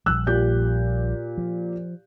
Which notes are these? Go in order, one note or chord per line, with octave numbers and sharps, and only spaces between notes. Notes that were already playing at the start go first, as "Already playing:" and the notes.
A#1 F3 G3 E6 F#6
A#2 G4 G6
F3